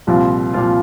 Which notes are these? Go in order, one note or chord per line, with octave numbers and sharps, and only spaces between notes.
C2 A#2 F3 C4 F4
A#2 F3 C4 F4